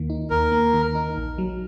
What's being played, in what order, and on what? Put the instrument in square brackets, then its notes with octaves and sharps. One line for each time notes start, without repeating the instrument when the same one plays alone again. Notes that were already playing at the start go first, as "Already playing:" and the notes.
Already playing: [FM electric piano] D#2 D#3 A#3
D#4
[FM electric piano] D#2 [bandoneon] A#4
[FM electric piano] A#3
D#3
D#4
A#1
F#3